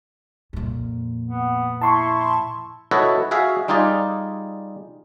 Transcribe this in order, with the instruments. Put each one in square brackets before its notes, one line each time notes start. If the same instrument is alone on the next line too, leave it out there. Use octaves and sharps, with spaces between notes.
[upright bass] F2 A#2
[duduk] B3
[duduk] E4 [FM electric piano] A5 C6 C#6
[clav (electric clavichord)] E4 F#4 A4 B4 C#5 D#5
F#4 G#4 E5 F5
G3 D#4 F4 G#4 D5